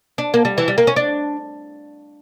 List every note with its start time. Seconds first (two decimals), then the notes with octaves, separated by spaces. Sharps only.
0.18 D4
0.34 A#3
0.45 G3
0.58 E3
0.68 G3
0.78 A#3
0.87 C#4
0.96 D4